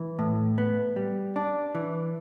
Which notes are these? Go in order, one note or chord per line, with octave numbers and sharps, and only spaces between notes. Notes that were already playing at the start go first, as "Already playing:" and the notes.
Already playing: E3
A2
B3
G3
D4
E3